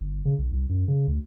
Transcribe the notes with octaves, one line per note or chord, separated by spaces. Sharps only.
G1
C#3
B1
C2
F#2
C#3
D2